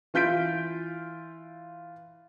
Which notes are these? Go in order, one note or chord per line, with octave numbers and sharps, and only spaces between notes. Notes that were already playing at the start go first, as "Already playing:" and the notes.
E3 F4 G6 B6 D7